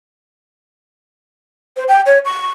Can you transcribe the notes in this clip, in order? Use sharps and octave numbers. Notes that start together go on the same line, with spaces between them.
C5
G5
C#5
C#6